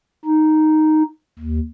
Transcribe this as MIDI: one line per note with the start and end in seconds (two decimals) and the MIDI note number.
0.25 1.02 63
1.39 1.60 39